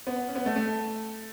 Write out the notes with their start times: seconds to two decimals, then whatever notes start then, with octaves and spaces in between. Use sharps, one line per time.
0.07 B3
0.28 C#4
0.36 B3
0.46 A3
0.56 A3